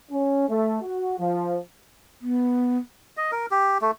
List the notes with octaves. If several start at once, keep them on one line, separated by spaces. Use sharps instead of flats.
C#4
A3
F#4
F3
B3
D#5
A#4
G4
A3